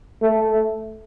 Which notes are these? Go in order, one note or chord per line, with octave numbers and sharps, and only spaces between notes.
A3